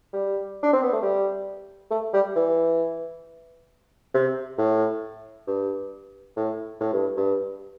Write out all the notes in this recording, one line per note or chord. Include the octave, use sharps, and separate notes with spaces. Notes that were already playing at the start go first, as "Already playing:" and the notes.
G3
D4
C4
B3
A3
G3
A3
G3
E3
C3
A2
G2
A2
A2
G2
G2